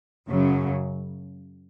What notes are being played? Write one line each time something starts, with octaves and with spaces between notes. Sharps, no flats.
F#2 C#3 F#3